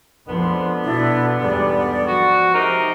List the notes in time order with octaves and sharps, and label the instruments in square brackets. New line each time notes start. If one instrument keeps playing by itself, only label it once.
[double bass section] F2 F3 G#3 [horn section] D3 B3
[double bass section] B2 [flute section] D4 E4
[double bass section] E2 G#2 G3 [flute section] D5
[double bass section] F3 [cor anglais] F#4
[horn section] G#2 C3 D#4 [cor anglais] A#4